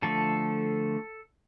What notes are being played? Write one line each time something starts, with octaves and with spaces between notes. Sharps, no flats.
D3 F3 A3 A4